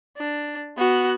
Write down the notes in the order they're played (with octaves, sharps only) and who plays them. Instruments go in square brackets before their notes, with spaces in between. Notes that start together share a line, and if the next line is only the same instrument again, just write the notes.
[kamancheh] D4
B3 F#4